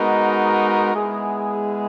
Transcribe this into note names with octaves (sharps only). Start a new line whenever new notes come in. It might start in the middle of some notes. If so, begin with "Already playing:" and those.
Already playing: G#3 B3 D#4 F#4 A#4
G#3 B3 E4 G#4